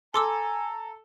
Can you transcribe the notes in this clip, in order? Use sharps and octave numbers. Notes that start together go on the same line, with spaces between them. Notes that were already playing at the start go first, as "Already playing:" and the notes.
A4 G#5 A#5 C6 D6 E6